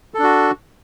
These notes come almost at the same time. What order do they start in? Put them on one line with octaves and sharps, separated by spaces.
A4 D4 F#4